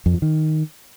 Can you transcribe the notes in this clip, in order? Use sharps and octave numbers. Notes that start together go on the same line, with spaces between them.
F2
F3
D#3